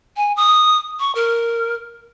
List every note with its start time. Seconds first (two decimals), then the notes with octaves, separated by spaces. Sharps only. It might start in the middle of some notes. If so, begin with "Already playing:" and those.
0.17 G#5
0.37 D#6
1.00 C#6
1.15 A#4